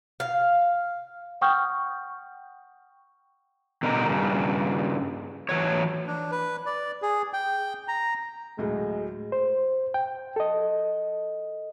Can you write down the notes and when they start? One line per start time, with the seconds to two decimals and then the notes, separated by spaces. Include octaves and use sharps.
0.20 F5
1.41 F#5 G5 C#6 D#6 F6 G6
3.83 B2 D3 G3 D#4 A4 A#4
4.08 G2 C#3
5.49 E3 F#3 C#5
6.07 D4
6.31 B4
6.66 D5
7.02 G#4
7.33 G5
7.88 A#5
8.58 D2 A2 F#3 G#3
9.32 C5
9.94 G5
10.36 A4 D#5